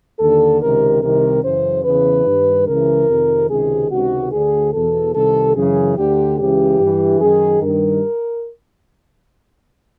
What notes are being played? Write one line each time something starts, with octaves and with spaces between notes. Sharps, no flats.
D#2 D3 A4
C#2 C3 D#3 A#4
C2 C3 D#3 A#4
F#2 C#3 E3 C5
E2 C#3 E3 B4
G2 D#3
C#2 C#3 E3 A#4
F2 C3 D#3
C#2 C3 D#3 G#4
C#2 C3 D#3 F#4
D2 D3 G#4
E2 B2 A4
C2 C3 D#3 A4
F#2 C#3 E3 G#4
D2 D3 G4
C#2 C#3 E3 G4
G2 E3
F#2 D#3 G#4
G2 D#3 A#4